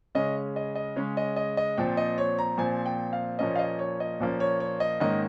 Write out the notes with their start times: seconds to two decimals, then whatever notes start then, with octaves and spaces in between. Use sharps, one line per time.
0.15 C#3 G#3 C#4 D#5
0.56 D#5
0.75 D#5
0.96 C#3 G#3 C#4 C#5
1.17 D#5
1.36 D#5
1.57 D#5
1.77 A#2 F3 C4 G5
1.97 D#5
2.18 C#5
2.39 A#5
2.58 A#2 F3 C4 G#5
2.86 G5
3.13 F5
3.39 A#2 F3 A#3 C#4 D#5
3.56 F5
3.59 D#5
3.79 C#5
4.00 D#5
4.20 A#2 F3 A#3 C#4
4.40 C#5
4.60 C#5
4.80 D#5
5.00 G#2 D#3 A#3 C#4 D#5